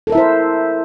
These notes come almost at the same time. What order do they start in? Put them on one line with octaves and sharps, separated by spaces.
A4 A#4 E5 E4 C5